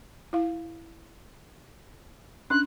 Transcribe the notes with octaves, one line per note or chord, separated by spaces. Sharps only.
E4 F5
C#4 D4 F#6